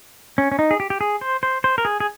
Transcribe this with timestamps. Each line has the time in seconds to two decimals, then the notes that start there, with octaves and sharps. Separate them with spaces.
0.38 C#4
0.52 C#4
0.59 D#4
0.71 G#4
0.80 G4
0.90 G4
1.01 G#4
1.21 C5
1.43 C5
1.64 C5
1.78 A#4
1.85 G#4
2.00 G#4